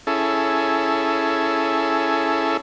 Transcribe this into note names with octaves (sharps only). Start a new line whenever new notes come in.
C#4 E4 G#4 A4